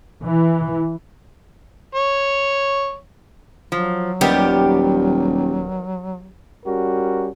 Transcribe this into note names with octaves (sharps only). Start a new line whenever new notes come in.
E3
C#5
F3 F#3
D#1 D#3 G3 B3 G4
G3 C#4 F#4 A#4